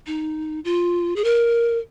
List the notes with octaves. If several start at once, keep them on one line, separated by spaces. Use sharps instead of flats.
D#4
F4
G#4
A#4